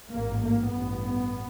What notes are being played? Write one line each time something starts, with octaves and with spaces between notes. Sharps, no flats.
A1 G#2 A#3
A#3
A1 G2 B3